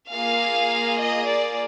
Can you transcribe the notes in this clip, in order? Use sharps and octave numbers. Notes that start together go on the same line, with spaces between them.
A#3 F4 G#4 F5
D#5
D5